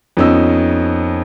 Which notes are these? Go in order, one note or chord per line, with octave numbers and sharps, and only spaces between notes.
F2 B3 C#4 D#4 E6